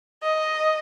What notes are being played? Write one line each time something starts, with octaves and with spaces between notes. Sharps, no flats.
D#5